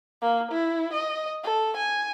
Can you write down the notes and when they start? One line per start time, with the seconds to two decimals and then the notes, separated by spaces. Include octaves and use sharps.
0.22 A#3
0.51 E4
0.93 D#5
1.44 A4
1.77 G#5